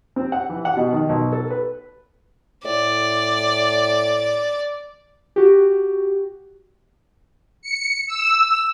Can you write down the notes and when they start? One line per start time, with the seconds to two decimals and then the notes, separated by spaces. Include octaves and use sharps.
0.16 C4
0.32 F#5
0.50 E3
0.65 F#5
0.77 B2
0.93 D#3
1.09 B1
1.33 A4
1.51 B4
2.65 A2 D5
5.36 F#4 G4
7.62 C#7
8.07 E6